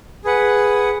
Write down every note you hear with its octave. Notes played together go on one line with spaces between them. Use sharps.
G#4 B4 F#5